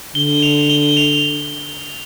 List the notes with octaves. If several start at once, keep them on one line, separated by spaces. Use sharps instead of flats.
D3 G7
F7
G7
F7